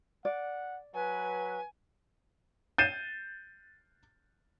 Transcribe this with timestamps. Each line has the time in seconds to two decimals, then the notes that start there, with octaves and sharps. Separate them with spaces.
0.25 D5 F#5
0.95 F#3 B4 G#5
2.78 G6 A6 C7 D#7 E7